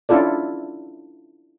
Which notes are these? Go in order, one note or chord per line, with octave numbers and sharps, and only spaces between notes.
C#4 D4 E4 F4 A4 D5